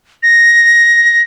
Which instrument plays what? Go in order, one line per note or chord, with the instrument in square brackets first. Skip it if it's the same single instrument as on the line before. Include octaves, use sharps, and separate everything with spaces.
[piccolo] A#6